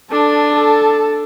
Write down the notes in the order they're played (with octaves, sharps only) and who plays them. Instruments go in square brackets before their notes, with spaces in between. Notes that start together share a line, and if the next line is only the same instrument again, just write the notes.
[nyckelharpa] D4 [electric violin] A4
[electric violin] A4